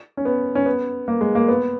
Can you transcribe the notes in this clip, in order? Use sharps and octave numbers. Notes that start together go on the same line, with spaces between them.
C#4
B3
C#4
B3
A#3
G#3
A#3
B3